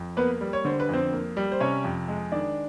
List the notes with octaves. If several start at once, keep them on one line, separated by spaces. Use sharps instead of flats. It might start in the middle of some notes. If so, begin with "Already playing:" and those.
Already playing: F2
A#3 B3 B4
G3
C#5
D3 C5
B4
F2 C4 C5
A#3
G3
C5
C3 C#4 C#5
F2
G#3
D#3 D4 D5